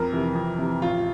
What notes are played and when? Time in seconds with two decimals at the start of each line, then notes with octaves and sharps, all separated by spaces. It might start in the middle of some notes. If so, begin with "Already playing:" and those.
Already playing: F2 A#4
0.12 C3 E3
0.35 F2
0.58 C3 E3
0.82 A1 F4